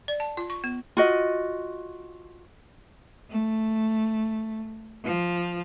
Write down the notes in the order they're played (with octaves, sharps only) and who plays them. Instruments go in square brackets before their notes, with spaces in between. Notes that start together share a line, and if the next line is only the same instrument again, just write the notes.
[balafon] D5
A5
F4
C#6
B3
[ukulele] F4 F#4 D#5
[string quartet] A3
F3